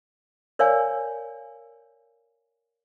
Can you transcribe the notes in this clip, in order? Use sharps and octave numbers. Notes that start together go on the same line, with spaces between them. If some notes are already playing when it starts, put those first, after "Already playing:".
A#4 C#5 D5 F5 G#5